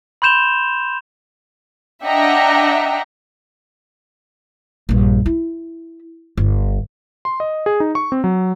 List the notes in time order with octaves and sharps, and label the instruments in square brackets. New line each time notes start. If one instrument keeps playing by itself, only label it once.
[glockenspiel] B5 C6 G6 E7 F7 G7
[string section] D4 D#5 E5 F#5 G5 A#5
[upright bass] A#1 G2
E4
G1
[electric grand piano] C6
D#5
G#4
D#4
C#6
C4
F#3